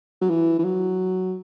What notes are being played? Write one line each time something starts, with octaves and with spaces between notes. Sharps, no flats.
F#3
E3
E3
F#3